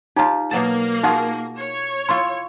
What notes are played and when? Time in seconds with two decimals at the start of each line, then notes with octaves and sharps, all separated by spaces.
0.16 D#4 F4 G4 C#5 A#5
0.51 B2 F#3 A#3 A5
1.03 D#4 F4 F#4 G#4 F5
1.59 C#5
2.09 E4 F4 C6 C#6